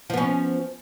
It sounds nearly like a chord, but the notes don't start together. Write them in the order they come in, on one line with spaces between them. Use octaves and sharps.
F3 B3 C#4